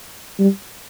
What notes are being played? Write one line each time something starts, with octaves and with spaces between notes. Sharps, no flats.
G3